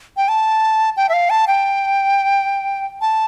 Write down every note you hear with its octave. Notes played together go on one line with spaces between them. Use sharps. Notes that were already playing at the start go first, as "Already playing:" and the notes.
G5
A5
G5
E5
F5
A5
G5
A5